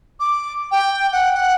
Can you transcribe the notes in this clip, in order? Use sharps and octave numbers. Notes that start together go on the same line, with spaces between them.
D6
G5
F#5
F#5